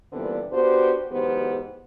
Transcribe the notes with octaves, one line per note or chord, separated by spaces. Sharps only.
A#2 D3 E3 G3 B3 C4
B3 D4 F#4 G4 C5
E2 G#2 F#3 B3 G4 C5